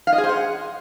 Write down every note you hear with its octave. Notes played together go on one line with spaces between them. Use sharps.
F5
D#5
G#4
C5
F#5